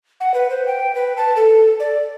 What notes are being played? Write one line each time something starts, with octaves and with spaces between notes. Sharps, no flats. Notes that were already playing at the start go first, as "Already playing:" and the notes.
F#5
B4
C5
G5
B4
A5
A4
D5